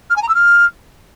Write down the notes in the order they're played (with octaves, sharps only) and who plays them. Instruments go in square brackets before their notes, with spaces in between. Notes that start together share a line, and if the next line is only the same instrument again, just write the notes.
[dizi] F6
G#5
A#5
E6
F6